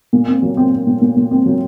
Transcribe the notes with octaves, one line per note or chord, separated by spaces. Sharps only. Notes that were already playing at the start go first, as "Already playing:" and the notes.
A#2
C4
F#3
C4
C4
A#2
A#2
A#2
C4
F#3